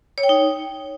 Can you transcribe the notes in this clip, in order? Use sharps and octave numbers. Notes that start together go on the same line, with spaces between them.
C#5
G5
D#4